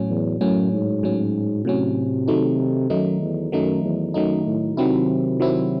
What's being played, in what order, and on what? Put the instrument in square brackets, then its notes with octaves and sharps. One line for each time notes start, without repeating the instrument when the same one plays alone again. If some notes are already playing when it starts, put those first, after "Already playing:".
Already playing: [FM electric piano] A2 F#3 C#4
[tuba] E2
[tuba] F#2 [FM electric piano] A2 F#3 C#4
[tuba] G#2
[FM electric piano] A2 F#3 C#4
[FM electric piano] A2 F#3 C#4 [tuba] C3
[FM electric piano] D#3 F#3 A3 D#4
[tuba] F#2 [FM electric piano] D#3 F#3 A3 D#4
[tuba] E2
[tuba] F#2 [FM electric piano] D#3 F#3 A3 D#4
[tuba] E2
[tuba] F#2 [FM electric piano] D#3 F#3 A3 D#4
[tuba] A2
[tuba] C3 [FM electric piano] D#3 F#3 C4 E4
[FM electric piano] D#3 F#3 C4 E4